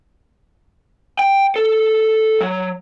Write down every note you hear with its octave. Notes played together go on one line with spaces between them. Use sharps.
G5
A4
F#3